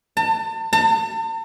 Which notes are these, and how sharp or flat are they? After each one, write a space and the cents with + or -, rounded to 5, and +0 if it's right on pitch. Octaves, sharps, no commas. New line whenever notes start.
A5 +35
A5 +40